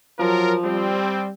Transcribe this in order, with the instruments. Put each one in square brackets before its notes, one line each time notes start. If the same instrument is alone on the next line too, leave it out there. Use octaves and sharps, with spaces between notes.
[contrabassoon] F3 [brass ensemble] F#3 F4 A#4
[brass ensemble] G3 C4